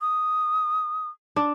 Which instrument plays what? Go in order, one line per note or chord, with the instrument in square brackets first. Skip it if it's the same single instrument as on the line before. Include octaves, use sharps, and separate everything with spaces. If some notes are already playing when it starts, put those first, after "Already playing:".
[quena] D#6
[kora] D4